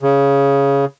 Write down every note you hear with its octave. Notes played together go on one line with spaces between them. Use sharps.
C#3